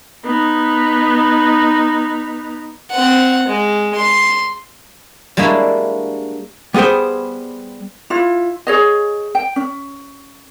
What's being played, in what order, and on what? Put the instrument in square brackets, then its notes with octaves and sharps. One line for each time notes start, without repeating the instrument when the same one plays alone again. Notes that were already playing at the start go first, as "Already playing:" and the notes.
[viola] B3 D#4
[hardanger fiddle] C4 F#5
G#3
C6
[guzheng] G3 G#3 A#3 D4 E4 F#4
[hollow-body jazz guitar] G3 B3 G#4 C5 G5
[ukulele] E4 F4
G#4 C#5 D#5
G5
C#4